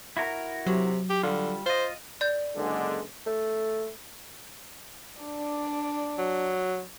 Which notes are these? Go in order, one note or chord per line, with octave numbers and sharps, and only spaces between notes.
E4 F#4 A#4
C3 F#3
G4
D3 G3 F4
F4 C5 D#5
D5 G6
F#1 D3 G#3
A3
D4 D5
F#3